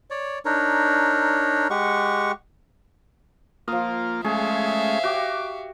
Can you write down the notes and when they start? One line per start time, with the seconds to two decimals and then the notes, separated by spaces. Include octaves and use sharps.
0.10 C#5 D5
0.45 D4 D#4 A#4 C#5
1.70 G#3 G4 F#5 C#6
3.68 F3 A#3 F4 D#6
4.25 G#3 A3 C#4 G#4 E5 F5
5.04 F#4 G4 D6